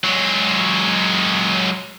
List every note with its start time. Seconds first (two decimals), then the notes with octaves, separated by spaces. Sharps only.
0.04 F#3 G#3